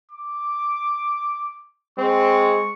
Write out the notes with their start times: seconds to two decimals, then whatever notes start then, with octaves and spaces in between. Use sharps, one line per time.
0.11 D6
1.98 G#3 C4 C#6